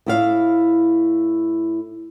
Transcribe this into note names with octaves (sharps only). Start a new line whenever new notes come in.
A2 E4 F5